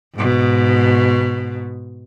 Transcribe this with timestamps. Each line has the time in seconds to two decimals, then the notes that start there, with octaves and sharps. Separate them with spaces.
0.14 G#2 B2